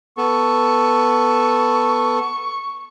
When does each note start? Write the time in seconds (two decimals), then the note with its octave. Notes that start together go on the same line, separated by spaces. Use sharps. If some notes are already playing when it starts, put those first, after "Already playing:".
0.18 B3 A4 C#6